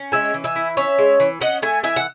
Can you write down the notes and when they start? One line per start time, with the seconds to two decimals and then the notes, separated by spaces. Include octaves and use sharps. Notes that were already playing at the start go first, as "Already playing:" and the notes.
Already playing: C#4
0.12 G#3 E5 G#5
0.34 E3
0.44 E5 G#5
0.56 E4
0.77 C#4 C#5 E5
0.98 G#3
1.20 E3
1.41 C#4 D#5 F#5
1.62 A3 E5 G#5
1.83 E3 E5 G#5
1.96 F#5